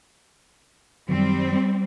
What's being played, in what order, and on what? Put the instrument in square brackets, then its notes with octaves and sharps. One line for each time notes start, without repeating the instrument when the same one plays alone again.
[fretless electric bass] F#2 D#3 F#3 [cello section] G3 C4